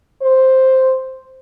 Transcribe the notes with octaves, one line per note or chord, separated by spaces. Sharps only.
C5